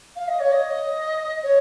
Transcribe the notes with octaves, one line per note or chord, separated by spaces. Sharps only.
F5
D#5
C#5
D#5
C#5